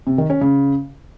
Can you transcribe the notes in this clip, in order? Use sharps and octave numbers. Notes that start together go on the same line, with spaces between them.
C3
D#3
C#4
C#3